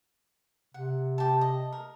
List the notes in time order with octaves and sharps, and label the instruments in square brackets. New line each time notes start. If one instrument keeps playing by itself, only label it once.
[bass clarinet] C3 [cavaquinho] F#5
[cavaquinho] G4 A5
D#5
A#4